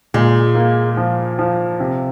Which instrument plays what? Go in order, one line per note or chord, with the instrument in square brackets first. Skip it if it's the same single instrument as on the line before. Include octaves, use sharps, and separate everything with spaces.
[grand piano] A#2 [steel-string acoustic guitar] G#3
[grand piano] A#3
F3
F3
C3